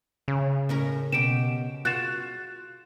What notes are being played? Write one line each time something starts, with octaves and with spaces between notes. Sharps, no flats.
C#3
A2 C#4 A#4
B2 G4 D7 E7
F4 F#4 F#6 A6 E7